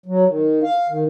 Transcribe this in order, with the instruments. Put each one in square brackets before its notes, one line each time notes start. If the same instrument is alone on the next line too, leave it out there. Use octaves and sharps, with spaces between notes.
[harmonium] F#3
D#3
F5
D#3